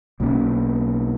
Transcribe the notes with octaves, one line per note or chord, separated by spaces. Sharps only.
B1 B2 A#3 C#4